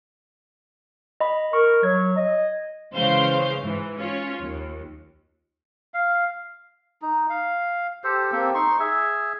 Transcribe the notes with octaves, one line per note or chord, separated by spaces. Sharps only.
D#5 B5
A#4 C#6
F#3 G#6
D#5
C#3 E3 G#3 C5 F5 G6
G#2 E3
C#4 F4 C#5
D#2
F5
D#4
F5
G4 A4 C5
A#3 C4 G4 A4
D#4 C6 C#6
G#4 E5